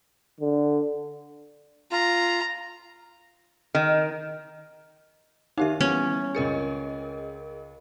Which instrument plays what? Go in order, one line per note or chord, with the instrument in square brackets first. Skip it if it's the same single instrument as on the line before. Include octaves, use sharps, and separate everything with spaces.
[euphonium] D3
[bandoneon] F4 [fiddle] A#5
[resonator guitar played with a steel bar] D#3
[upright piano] D#3 F5 [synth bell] D#4 G4 E5
[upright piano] E3 B3 [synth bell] G3 [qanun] C#4
[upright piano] C#2 C#7 [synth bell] G#4 A#4 D#5